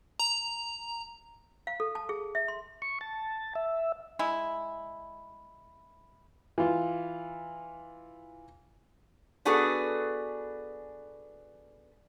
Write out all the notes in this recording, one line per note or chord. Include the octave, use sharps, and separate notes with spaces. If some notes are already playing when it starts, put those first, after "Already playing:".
A#5
F5
A4
A5
G#4
E5
C6
C#6
A5
E5
G#3 E4
E3 F4
B3 D4 F#4 G#4 A4 B4